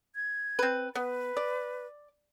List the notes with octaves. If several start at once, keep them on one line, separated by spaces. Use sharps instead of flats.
G#6
C4 B4
B3 B4
D5